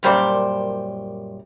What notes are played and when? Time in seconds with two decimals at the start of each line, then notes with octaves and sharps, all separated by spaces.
0.03 F#2 A#2 G3 C5 D5